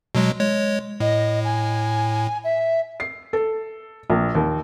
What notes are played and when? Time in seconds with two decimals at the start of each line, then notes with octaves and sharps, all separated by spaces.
0.15 B2 F#3 G#3
0.39 G#3 C#5
1.00 A2 D#5
1.44 G#5
2.43 E5
3.00 C7
3.33 A4
4.10 A#1
4.35 D#2